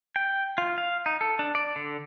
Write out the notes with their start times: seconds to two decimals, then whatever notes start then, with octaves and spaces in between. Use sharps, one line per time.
0.16 G5
0.58 F4
0.78 F5
1.06 D#4
1.21 A4
1.39 D4
1.55 D5
1.76 D3